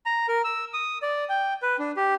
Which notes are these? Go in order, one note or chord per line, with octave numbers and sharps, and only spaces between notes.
A#5
A#4
E6
D#6
D5
G5
B4
D4
G4